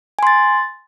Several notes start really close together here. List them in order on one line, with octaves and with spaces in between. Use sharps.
G#5 C6 A6